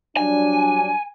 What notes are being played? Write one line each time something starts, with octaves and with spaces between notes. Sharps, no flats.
F#3 G3 D4 G#5